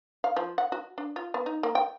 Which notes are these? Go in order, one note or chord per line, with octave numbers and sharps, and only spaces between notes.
F5
F3
F#5
F#4
D4
F4
B3
D#4
A#3
G5